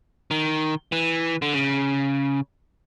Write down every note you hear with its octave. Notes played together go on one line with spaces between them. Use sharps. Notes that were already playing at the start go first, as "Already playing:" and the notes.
D#3
E3
D3
C#3